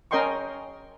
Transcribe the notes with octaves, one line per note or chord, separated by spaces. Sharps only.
C#4 A#4 D#5 G5 C6 C#6